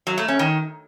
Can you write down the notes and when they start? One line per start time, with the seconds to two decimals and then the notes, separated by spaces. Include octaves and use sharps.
0.07 F#3
0.18 A3
0.28 C#4
0.39 D#3